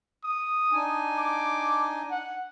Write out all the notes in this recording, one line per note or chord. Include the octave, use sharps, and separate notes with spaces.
D#6
D4 D#4 G#5
D6
F#5